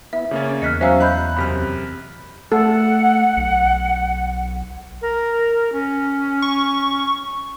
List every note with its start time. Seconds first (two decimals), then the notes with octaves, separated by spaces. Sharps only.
0.13 B3 E4 E5
0.31 C#3 A#3 C#4 C#5 D5
0.62 E2 D#5 F6 F#6 B6 C#7
0.81 F#3 C#4 C5 E5 F5 G#5 A#5 E6
1.01 D#5 B5 F#6 G6
1.36 F#2 C3 B5 F6 B6
2.52 A3 A4 F#5
3.37 B1
5.02 A#4
5.72 C#4
6.42 C#6